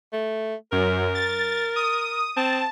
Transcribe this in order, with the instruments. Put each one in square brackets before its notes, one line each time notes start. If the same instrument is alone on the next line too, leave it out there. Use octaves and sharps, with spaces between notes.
[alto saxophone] A3
[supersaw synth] F#2 [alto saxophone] A#4
[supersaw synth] A6
D#6
[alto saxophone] C4 [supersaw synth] A5